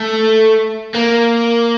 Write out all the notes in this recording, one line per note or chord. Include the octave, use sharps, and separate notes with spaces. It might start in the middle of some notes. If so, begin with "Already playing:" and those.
Already playing: A3
A#3